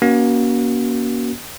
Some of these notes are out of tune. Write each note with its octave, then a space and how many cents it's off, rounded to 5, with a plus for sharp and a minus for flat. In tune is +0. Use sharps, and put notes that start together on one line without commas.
A#3 +35 C#4 +25 F#4 +20